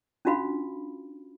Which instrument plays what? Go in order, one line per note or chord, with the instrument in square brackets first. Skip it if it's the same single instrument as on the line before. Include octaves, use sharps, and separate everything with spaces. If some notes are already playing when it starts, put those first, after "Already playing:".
[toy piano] C#4 D4 F4 F#4 F5 B5